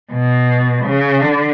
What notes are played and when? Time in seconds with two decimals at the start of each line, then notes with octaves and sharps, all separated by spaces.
0.12 B2
0.85 C#3
1.22 D3